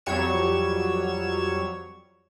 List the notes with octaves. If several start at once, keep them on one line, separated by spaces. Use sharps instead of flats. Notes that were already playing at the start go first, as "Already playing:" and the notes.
F2 F#3 G3 C#5 G#6 E7